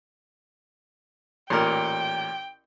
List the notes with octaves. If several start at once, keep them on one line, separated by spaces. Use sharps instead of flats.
A1 A#2 A#4 G5